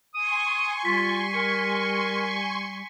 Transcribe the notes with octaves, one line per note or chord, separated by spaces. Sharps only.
G#5 C6 C#6 D#6
G3 F4 B6
A#4 C#7